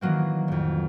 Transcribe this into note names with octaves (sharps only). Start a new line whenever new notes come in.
D#3 E3 F#3 A#3 C4
A1 F2